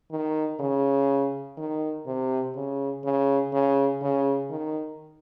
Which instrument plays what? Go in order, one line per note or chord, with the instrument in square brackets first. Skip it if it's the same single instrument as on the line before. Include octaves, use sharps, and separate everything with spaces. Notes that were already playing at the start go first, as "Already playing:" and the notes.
[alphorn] D#3
C#3
D#3
C3
C#3
C#3
C#3
C#3
D#3